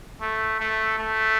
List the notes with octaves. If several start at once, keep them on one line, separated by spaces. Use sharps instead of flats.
A3
A3
A3